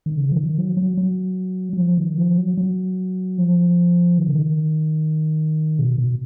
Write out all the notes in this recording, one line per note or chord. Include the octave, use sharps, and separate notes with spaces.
D#3
C#3
F3
D#3
F#3
F#3
F#3
F#3
F3
D#3
F3
F#3
F#3
F3
D#3
C#3
D#3
B2
B2